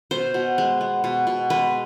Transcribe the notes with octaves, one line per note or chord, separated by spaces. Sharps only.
B2 C5
B2
G#3
B3
B2
B2
G#3 B4